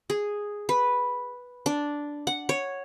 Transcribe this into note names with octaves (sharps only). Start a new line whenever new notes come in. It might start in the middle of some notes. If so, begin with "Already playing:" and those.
G#4
B4
D4
F#5
C#5